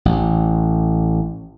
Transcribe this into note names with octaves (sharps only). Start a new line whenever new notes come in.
A1